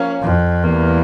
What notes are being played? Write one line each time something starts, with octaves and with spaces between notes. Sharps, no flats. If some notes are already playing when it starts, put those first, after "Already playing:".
Already playing: F3 A#3 C#4
F2
E2 A2 E3 G3 A#3